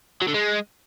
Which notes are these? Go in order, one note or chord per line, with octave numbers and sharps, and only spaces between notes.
F#3
D3
G#3